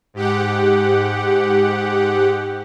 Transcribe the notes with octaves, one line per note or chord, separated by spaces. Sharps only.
G#2 G4 F#5